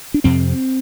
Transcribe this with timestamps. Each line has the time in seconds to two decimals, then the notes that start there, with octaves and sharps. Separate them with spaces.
0.14 D4
0.24 F2 C3 C4